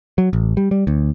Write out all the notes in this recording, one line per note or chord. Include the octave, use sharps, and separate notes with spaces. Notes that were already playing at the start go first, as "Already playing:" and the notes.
F#3
A1
G3
G3
D2